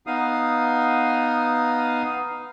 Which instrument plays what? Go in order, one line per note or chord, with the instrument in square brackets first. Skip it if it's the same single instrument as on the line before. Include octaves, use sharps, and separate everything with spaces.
[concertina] B3 D#4 F5 D#6